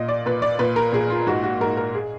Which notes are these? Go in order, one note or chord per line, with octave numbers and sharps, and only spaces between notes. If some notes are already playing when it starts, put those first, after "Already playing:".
Already playing: A#2 D#5
D5
A#2 B4
D5
A#2 B4
A#4
A#2 G#4
F4
G#2 F#4
F#4
G#2 A#4
A#4
G#4